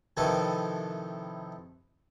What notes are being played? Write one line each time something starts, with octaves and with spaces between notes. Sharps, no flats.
C3 D#3 F3 E4 A4 B4